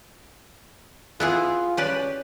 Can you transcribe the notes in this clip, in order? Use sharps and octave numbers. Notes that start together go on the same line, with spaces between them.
B3 E4 F4 G#4
C#4 G4 B4 D5